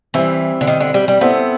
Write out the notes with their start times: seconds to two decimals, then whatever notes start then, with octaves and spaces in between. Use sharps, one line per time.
0.14 E3 G3 C4 E4
0.61 D3
0.67 D#3
0.80 D3
0.94 G3
1.08 G3
1.21 B3 C4 E4 A4 C5